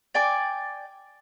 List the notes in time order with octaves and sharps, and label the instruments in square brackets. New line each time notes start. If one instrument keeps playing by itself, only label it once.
[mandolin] D5 G5 G#5 D6